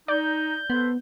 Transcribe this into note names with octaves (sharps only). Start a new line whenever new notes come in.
D#4 D5 G6
B3 A4 B4 C5